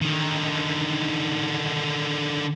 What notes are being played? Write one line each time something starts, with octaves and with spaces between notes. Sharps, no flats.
D3 D#3